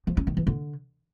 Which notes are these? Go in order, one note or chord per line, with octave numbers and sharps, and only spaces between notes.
F3
C#4
D#3
E3
D3